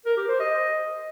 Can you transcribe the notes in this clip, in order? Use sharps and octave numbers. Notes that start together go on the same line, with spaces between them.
A#4
G4
C5
D#5